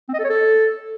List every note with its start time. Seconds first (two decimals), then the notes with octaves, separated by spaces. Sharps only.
0.08 C4
0.14 D#5
0.19 A4
0.24 C#5
0.29 A4